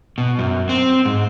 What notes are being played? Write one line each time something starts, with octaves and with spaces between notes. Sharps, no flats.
B2
F#2
C4
G#2